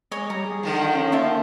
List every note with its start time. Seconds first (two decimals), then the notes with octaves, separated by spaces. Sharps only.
0.11 G#3 C#5 D#5
0.30 G3 A#5
0.45 G#4
0.63 D3 D#3 F3
0.95 C#4
1.12 A#3 C5 E5 A5